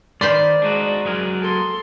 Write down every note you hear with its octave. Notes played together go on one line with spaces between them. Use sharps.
D#3 C5 D5 B5 C6
G#3 D4 D#4 F#4
F#3 G#4 A#4
A4 C6